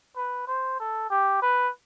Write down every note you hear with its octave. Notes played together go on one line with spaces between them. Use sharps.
B4
C5
A4
G4
B4